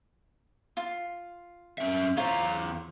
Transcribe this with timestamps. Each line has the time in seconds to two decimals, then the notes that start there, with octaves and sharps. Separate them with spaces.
0.77 F4
1.78 F#2 C#4 E5
2.17 E2 F4 C5 C#5 A#5